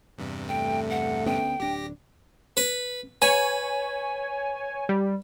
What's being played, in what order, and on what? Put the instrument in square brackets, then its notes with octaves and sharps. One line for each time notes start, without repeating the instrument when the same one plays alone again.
[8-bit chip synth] E2 G2 C3
[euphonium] A3 [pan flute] G5
[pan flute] F#5
[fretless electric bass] D2 B3 C#4 [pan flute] G5
[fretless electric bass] D1 D4 [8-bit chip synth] G4 A#6
[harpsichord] B4
[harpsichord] B4 [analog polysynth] C#5 G#5
[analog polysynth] G3